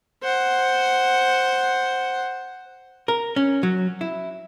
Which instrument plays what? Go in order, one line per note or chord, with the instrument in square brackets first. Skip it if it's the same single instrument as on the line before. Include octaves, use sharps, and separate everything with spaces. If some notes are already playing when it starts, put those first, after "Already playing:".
[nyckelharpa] C5 F#5
[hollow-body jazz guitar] A#4
C#4
F#3
E4